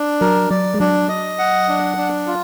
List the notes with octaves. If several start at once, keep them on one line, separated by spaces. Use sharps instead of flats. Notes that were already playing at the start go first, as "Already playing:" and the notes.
Already playing: D4
F#3 A#4
F#3 D5
G#3
F#3 D4
D#5
F#5
D4
D4
F4